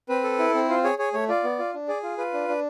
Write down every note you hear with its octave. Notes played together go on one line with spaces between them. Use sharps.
C4 B4
A4
E4
C4
F4 C5
G#4 C#5
G#4 C#5
A3 C#5
F4 D5
B3
F4
D4
G#4 D5
F4
F4 B4
D4
D4